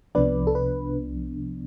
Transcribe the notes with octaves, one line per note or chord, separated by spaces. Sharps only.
C2 C3 F3 B3 D4 B4 D5
A4
B4